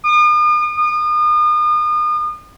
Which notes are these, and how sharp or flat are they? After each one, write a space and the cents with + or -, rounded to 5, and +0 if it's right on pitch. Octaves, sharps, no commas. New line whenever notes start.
D#6 -45
D#6 -35